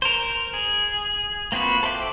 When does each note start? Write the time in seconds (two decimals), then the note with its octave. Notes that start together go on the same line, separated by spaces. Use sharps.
0.02 A#4 C5
0.54 G#4
1.52 A#3 C4 F4 F#4 B4
1.83 A4 C5 E5 G5 D6